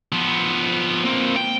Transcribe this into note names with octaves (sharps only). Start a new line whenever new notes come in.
F3 B3
A#3 C4
G5